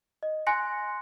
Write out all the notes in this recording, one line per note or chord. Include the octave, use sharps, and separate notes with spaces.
D#5
G#5 C6 F#6 A#6 C#7